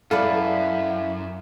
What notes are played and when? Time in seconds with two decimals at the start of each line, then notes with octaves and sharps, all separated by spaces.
0.11 F#2 E4 A4 B4 D5 F5